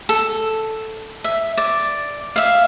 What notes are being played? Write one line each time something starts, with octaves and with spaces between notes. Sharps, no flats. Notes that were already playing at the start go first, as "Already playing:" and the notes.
A4
E5
D5
E5 F5